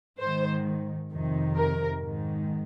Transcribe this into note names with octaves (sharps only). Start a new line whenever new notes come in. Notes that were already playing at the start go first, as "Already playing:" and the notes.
G#2 D#3 C5
F2 C3 D#3
A#4
G#2 D#3